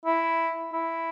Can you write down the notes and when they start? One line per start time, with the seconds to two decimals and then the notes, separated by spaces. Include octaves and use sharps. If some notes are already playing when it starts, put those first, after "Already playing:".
0.06 E4
0.73 E4